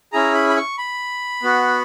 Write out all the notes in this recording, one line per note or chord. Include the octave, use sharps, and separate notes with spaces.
C#4 E4 G#4 A#5
B5
B5
C#6
B5
B3 F#4